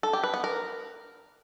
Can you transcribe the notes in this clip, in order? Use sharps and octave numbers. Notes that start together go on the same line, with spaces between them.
A4
G4
B4
B3
A#4